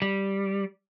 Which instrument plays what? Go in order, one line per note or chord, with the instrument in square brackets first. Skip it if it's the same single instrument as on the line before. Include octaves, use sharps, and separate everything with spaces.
[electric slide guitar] G3